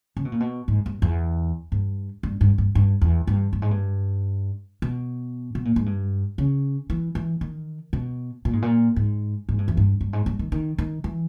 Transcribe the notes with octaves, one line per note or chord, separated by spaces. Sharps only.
C#3
B2
A#2
B2
G#2
G2
E2
G2
G2
G2
G2
G2
E2
G2
G2
G#2
G2
B2
B2
A#2
G#2
G2
C#3
E3
E3
D#3
B2
A#2
G#2
A#2
G#2
G#2
G2
E2
G2
G2
G#2
G2
D#3
D#3
D#3
E3